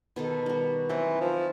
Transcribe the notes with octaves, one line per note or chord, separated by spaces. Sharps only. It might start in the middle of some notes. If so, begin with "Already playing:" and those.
B2 D#3 A4
G3 F#4
E3 F#3 C4 D#4
F3